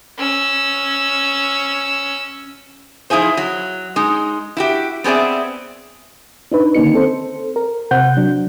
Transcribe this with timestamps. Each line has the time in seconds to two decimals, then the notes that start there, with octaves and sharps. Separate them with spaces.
0.18 C#4 E6
3.10 F3 D#4 E4 G#4 C5
3.37 F#3
3.96 G#3 D#4
4.57 E4 F#4 G4
5.04 B3 C4 G#4 D5 E5
6.51 D4 D#4 B4
6.75 D3 D#3 A#3 C#4 D#4 C#7
6.94 C4 A4 C5
7.56 A#4
7.91 C3 C5 F#5 G6
8.17 F#3 D4